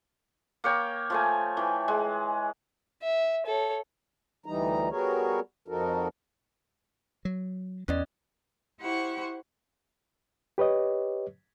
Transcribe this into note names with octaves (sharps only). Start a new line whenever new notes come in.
A#3 C#5 G5
F3 A3 G#5
E3 G5
G#3
E5
A4 C#5
D2 E3 G3 D#4 A#5
G3 B3 F#4 G#4 A#4 C#5
F2 F3 D#4 F#4 A4 A#4
F#3
E2 E3 C#4 D5 D#5
E4 G4 C5 F#5 C#6
G4 B4 C#5 D#5